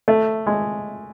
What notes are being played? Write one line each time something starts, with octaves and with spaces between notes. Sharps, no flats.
A3
G#3